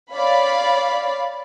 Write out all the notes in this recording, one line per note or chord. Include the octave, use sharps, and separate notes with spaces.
C#5 D5 F5 B5